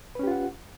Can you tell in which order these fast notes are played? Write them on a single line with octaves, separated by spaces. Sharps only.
B4 C#4 G4 F4 F#5